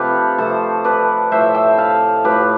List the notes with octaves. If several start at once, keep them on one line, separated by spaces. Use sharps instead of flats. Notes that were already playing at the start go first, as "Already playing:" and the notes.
Already playing: C3 F3 A3 F4 G4 A4 B4
C3 F3 A3 A4 C5
B4 D5
A2 F3 A3 C5 E5
E5 G5
F5 A5
A2 F3 A3 G4 B4